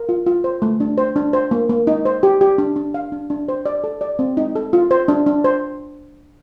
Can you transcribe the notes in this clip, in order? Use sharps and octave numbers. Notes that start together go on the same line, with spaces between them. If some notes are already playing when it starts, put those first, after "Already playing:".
Already playing: A#4
F4
F4
C5
A3
D4
C5
D4
C5
A#3
A#3
D#4
C5
G4
G4
D4
D4
F5
D4
D4
C5
D5
A4
D5
C4
D#4
A4
F4
C5
D4
D4
C5